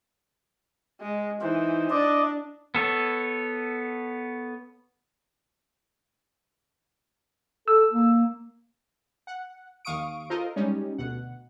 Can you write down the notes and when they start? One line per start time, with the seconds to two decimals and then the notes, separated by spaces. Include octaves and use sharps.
1.01 G#3
1.41 E3 D#4 C5
1.90 D4 D5 D#5
2.75 B3 A4 C#5
7.68 A4 E6
7.91 A#3
9.27 F#5
9.85 D#2 F5 C#6 D#6 D7
10.30 F4 A4 A#4 C5 D#5
10.56 G3 G#3 C#4 D#4
10.98 D2 B2 F#5